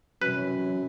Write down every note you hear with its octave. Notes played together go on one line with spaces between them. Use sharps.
F#2 C3 E3 F#3 B4